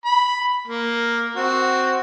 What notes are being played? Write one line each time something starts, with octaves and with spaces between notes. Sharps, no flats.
B5
A#3
C4 F#4